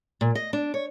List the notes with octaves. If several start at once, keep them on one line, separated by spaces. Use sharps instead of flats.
A#2
D#5
D4
C#5